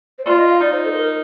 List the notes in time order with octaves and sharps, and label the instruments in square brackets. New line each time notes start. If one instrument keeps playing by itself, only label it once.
[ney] C5
[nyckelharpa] F4 [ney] D5
[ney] D#5
F5
[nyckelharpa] D#4 [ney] D5
[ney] C5
A4
C5
A#4